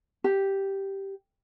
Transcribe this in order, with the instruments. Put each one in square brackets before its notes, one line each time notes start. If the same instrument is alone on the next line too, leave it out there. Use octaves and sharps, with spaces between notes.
[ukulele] G4